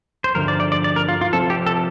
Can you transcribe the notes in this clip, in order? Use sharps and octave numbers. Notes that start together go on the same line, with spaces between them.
C5
G2 D3 F3 A#4
D5
D5
D5
D5
A#4
F4
F4
C3 F3 C4 A4
G4
A4